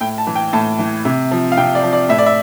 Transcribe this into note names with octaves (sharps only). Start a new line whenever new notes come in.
A2 G5
A5
E3
G5
A2 A5
E3
C3
F3
F5
C3 G5
D5
F3
D5
A2 E5
D5
E5